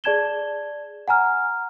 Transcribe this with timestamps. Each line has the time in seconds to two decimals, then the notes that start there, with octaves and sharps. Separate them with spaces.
0.04 G#4 D5 A5 G#6 E7 G7
1.08 F#5 G#5 A#5 F6